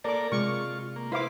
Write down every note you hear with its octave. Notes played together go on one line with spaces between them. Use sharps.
A#3 A4 A#4 D5 D6
C3 G#3 F4 C#6
A#3
E4 B4 C5 F5 D6